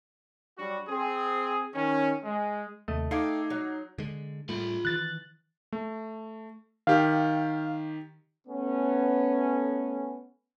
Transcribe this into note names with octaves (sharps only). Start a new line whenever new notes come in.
F#3 G3 D4 F#4
C4 G#4
D#3 C#4
G#3
D#2 C3 A3 D#5
D#4 A4 F5 G5 D6 G#6 C7
F#3
D3 G#3
A2 G3 A3 F4 B5
D#3 E3 F#6 A6
A3
D#3 G4 F5
A3 B3 C#4